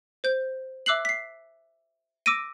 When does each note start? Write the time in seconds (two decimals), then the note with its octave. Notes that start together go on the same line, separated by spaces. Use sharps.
0.24 C5 G6
0.86 E5 D6 E6 F#6 C7 F#7
1.05 B6 C7
2.26 D6 E6 A#6 D7 D#7